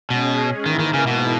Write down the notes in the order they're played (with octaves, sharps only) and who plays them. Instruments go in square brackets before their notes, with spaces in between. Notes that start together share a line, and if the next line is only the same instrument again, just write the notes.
[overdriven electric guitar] B2 [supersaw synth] G#3 C#4 G#4
[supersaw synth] G#2 E3 A#3 E4 A#4 [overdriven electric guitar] D#3
[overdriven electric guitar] D#3
C#3
B2